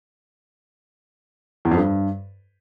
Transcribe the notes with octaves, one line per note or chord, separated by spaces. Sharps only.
E2
F2
G2